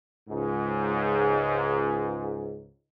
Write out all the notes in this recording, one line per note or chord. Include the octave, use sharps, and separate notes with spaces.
C#2 G#2